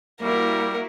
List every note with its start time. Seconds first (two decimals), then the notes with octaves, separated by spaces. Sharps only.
0.22 G3 A#3 E4 F#4 A#4